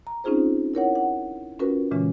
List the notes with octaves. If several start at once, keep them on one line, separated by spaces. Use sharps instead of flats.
A#5
C4 C#4 D#4 F4 G#4 C5
E4 A#4 C#5 F#5
F#5
C#4 F4 F#4 A#4 B4
A#2 C#3 E3 G#3 C#4